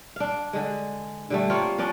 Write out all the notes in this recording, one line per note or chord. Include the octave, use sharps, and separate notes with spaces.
D4 F5
D3 G#3
D3 G3 A3
A#3 C4 F4 C#5
F3 C#4 D4 D5